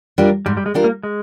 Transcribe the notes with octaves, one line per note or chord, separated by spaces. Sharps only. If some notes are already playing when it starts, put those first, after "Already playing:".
G3 D4 F4 A#4
G#2 G3
G3
G#3
G3 D4 F4 A#4
A#3
G#3